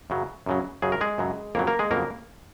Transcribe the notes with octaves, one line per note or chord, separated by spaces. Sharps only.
F#2 C#3 F#3
F#2 C#3 F#3
F#2 C#3 F#3 G#4
A#4
G#3 G#4
F#2 C#3 F#3
F2 C#3 F#3 A#3 A#4
A#3 A#4
G#3 G#4
F2 C#3 F#3 A#3 A#4